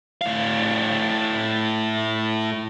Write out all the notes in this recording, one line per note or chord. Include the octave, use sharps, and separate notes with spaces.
A2 F5